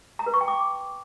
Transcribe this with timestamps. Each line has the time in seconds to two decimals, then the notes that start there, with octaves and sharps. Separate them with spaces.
0.19 A#5
0.26 B4
0.34 C#6
0.41 G5
0.48 D6